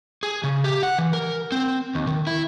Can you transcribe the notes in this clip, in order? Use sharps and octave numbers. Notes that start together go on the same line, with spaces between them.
G#4
C#3
G4
F#5
E3
A#4
C4
D#2
D#3
E4